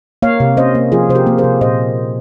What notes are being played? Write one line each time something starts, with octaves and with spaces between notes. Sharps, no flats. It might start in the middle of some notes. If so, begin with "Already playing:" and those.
A#3 C#5 F5
C3
C#4 C5 D#5
A#3
F3 F4 G#4
C3 C5
G4 A#4
A#3
G#4 C5
C3
A#2 C5 D#5